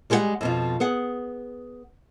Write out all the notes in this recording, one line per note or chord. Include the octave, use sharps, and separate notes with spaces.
G3 G#3 G4 G#4 F#5
F2 B2 F3
B3 G#4 F#5